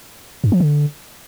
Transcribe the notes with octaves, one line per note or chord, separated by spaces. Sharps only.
G2
F3
D3